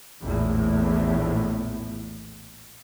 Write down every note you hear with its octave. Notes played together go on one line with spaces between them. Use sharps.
A#1 E2 A2